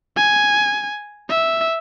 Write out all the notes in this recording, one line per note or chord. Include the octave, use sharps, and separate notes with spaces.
G#5
E5